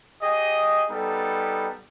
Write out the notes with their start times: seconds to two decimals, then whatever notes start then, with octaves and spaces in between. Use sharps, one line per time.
0.22 G4 G#4 D#5
0.90 G3 B3 D#4 A4